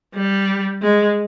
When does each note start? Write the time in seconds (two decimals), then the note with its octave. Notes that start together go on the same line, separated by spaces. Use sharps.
0.14 G3
0.82 G#3